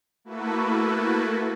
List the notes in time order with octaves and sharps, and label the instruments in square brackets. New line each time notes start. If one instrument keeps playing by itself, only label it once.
[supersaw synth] A3 A#3 E4 F#4 A4 B4